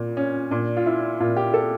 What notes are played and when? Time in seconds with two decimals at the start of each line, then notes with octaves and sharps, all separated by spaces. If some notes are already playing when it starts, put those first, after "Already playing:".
Already playing: A#2
0.17 C#4
0.51 A#2 D4
0.77 F4
0.86 E4
1.20 A#2 F4
1.37 G4
1.54 A4